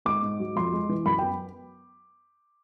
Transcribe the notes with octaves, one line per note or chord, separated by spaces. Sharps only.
G#2 D6
G#2
F#3
F2 C6
G#3
E3
F#2 B5
B3 G5